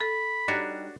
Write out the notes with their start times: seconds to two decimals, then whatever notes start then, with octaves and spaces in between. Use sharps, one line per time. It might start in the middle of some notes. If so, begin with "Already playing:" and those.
0.01 A4 B5
0.48 G3 D4 D#4 F#4 C#5